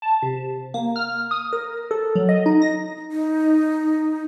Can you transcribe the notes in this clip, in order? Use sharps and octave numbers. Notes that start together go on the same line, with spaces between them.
A5
C3
A#3
F6
D#6
A#4
A4
F#3
D#5
D#4
A#6
D#4